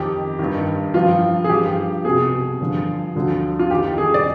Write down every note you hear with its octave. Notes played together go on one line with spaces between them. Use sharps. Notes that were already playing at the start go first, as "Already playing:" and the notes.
Already playing: F2 D#3 G4
G2 D#3
G2 F3 F4
G#4
G2 F3 G4
C2 B2 G#4
G2 D3 F3
D2 D3 F3
F4
F2 D#3 G4
G#4
D5